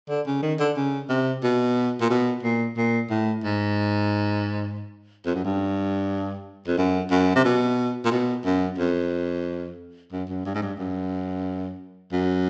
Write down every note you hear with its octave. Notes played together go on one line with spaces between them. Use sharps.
D3
C#3
D#3
D3
C#3
C3
B2
A#2
B2
A#2
A#2
A2
G#2
F2
F#2
G2
F2
F#2
F#2
C3
B2
A#2
B2
F#2
F2
F#2
F#2
G2
G#2
G2
F#2
F#2